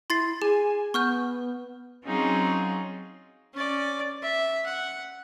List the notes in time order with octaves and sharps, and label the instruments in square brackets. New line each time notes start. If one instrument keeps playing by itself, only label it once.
[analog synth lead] E4 [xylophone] C6 A6 C7
[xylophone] G#4 [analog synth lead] G#5
[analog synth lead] B3 [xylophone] C#6 F6 G6
[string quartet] F#3 C4 C#4 D#4 F4 G#4
[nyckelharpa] C#4 D5
E5
F#5